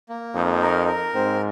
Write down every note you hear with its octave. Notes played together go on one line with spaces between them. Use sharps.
A#3
F2 D#4
A#4
A#4
G#2 C4